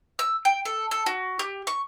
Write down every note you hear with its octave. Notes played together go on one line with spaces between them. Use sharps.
E6
G5
A4
A4
F#4
G4
C#6